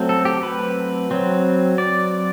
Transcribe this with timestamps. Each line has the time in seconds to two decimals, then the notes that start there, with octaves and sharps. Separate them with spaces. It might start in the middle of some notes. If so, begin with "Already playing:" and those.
Already playing: F#3 A3 C4
0.09 A4
0.25 G4
0.43 B4
1.11 F#3 C4
1.78 D5